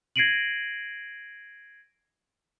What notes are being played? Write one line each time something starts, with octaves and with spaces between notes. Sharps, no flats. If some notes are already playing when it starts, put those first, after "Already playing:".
G#6 A#6 C7 D7 D#7 F#7